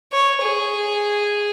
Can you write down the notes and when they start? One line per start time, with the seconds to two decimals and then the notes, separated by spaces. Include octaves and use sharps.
0.13 C#5
0.42 G#4